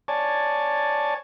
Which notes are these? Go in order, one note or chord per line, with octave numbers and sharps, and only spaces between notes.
C#5 D5 G#5 A5